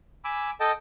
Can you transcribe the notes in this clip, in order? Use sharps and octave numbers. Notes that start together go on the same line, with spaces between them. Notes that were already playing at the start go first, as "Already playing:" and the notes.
G#5 B5 D6 E6
A4 D#5 G5 A5